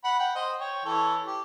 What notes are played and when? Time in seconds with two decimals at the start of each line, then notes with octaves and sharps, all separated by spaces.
0.04 F#5 B5
0.19 F#5 G5
0.35 C5 D#5
0.60 C#5 G5
0.85 E3 A4 C#5
1.26 G4